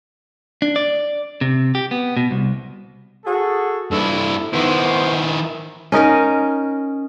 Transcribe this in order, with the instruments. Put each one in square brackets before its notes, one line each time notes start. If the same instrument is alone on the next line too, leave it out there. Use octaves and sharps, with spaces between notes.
[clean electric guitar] D4
D5
C3
G4
B3
B2
C2
[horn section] F#4 G#4 A4
[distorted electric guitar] G2 E4 [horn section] A4
[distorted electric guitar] D#3 E4 [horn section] B3 C5
[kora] C#4 D#4 A#4 D#5